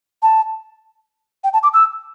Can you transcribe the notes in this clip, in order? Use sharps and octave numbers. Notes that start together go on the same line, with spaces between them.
A5
G5
A5
D6
E6